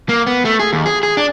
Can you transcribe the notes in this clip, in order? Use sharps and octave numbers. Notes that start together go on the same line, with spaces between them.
A#3
B3
A3
G#4
D#2
G#4
G#4
D4